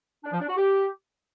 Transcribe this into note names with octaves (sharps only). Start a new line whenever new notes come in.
D4
F3
D4
F#4
G4